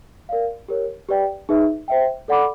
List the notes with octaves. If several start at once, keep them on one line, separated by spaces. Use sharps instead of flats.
A#4 D5 F5
G4 A#4 C#5
G4 B4 D5 G5
D#4 G#4 B4 E5
C5 E5 G5
A4 D5 F#5 B5 D6